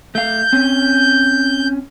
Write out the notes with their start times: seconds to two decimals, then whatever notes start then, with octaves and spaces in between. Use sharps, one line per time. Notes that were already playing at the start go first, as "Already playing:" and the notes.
0.15 A3 F5 G6
0.53 C4 C#4